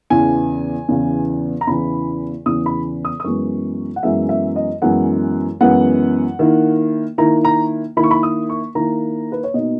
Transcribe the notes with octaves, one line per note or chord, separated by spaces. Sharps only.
E2 C#3 E3 G#5
E2 C#3 E3
A#5
E2 C#3 E3 B5
E2 C#3 E3 D#6
B5
D#6
D#6
F#2 E3 G#3 B3 C#6
F#5
F#2 E3 G#3 B3 E5
E5
D#5
F#2 E3 G#3 B3 F#5
F#2 E3 G#3 B3 F#5
D#3 A#3 E4
D#3 A#3 E4 A#5
A#5
D#3 A#3 E4 B5
C#6
B5
D#6
C#6
D#3 A#3 E4 A#5
B4
C#5
B2 A#3 D#4 D#5